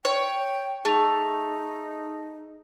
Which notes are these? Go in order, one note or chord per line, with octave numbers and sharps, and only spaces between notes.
C#5 G5
A3 D#4 G#4 F7